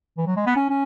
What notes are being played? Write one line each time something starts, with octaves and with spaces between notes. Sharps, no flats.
E3
F#3
G#3
B3
C#4
C#4